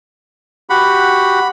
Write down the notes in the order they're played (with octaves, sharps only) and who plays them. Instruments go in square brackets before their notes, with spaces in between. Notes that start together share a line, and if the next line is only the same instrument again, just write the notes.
[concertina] F#4 G4 F#5 [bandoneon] B5